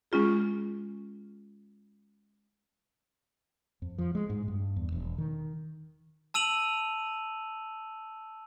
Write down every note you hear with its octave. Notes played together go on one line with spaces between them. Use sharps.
G#3 C#4 F4 G#4
F2
F3
G#3
G#2
G2
E2
E1
D#3
A5 E6 D#7 F7 F#7